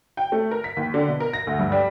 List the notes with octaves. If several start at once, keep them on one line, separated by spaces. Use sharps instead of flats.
G5
A3
A#4
B6
D#2
D3
B2
A#4
A#6
D2
G2
G3